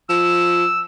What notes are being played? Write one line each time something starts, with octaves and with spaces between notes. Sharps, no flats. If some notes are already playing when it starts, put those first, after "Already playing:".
F3 E6